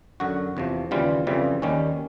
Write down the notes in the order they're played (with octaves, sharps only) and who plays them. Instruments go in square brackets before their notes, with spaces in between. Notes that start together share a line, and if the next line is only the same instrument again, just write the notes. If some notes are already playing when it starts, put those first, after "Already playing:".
[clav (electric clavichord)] F#2 D3 F#3 F#4
E2 C3 F3
D#2 C#3 E3 G3 F4
F2 C#3 E3 G3
D#2 D#3 G3 C#4